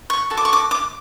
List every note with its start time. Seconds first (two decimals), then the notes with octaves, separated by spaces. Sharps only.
0.10 C#6
0.30 F#4 A4 C#5
0.37 D6
0.45 C#6
0.53 D6
0.71 D6